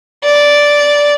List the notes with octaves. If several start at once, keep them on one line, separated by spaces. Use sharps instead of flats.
D5